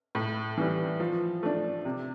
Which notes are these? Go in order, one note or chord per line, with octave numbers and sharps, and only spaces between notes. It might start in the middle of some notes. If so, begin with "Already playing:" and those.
A2
E3 G3
F3
A3 D4
C3